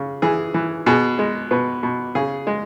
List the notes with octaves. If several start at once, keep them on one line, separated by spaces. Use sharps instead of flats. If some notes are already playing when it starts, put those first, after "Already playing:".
Already playing: C#3
E3 G#4
E3
B2 G#4
G#3
B2 B4
B2
C#3 G#4
G#3